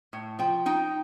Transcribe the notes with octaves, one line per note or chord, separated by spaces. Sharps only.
A2
F3 G5
D#4 G5